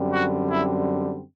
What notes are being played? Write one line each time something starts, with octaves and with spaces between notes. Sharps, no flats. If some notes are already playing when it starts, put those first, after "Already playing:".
Already playing: F#2 D3 G3 C4
F#4
E4